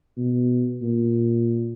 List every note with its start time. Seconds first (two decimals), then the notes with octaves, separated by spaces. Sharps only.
0.17 B2
0.82 A#2